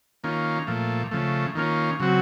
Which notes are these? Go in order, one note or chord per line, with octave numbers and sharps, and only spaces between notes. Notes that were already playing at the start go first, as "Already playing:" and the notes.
D#3 A#3 C#4 F4
A#2 F3 A3
C#3 F3 A3
D#3 A#3 C#4 F4
C#3 F#3 C4 F#4